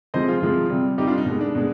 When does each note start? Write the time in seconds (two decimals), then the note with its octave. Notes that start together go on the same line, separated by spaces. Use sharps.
0.14 C3 F3 G#3 C5 D#5
0.28 F4 G#4
0.42 C3 F3 G#3
0.70 C3 G3
0.98 C3 G3 D#4 G4
1.07 D4 F4
1.17 D#4
1.26 B2 G#3
1.41 D4
1.55 B2 G#3